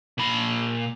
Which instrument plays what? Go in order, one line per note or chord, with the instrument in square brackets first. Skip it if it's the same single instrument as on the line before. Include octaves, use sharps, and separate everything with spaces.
[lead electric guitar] A#2 B5